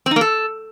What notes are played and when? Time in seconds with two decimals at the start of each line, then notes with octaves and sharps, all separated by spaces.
0.06 C4
0.11 D#4
0.16 A#3
0.21 A4